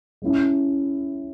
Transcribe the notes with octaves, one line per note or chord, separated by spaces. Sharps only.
G#3 C#4 E4